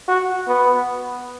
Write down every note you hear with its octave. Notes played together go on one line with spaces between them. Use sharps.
F#4
B3